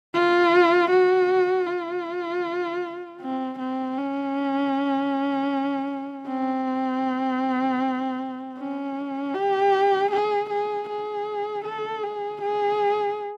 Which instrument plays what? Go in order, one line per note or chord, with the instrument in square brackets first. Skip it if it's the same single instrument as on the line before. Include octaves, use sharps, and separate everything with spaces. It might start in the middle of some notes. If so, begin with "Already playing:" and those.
[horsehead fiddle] F4
F#4
F4
C4
C4
C#4
C4
C#4
G4
G#4
G#4
G#4
A4
G#4
G#4